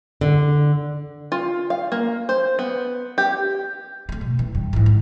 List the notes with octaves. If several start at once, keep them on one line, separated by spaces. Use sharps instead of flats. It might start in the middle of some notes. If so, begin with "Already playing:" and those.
D3
F4
F5
A#3
C5
B3
G4
G#3 A3
B2
E3
G2
G#2 E3
D2